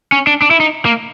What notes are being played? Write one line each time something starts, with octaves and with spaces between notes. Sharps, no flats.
C#4
D4
D4
E4
D#4
A#3